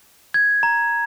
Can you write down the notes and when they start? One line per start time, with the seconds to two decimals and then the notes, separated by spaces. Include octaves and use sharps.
0.34 G#6
0.63 A#5